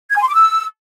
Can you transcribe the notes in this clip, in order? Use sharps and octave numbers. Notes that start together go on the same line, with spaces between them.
G#6
G#5
C6
D6
E6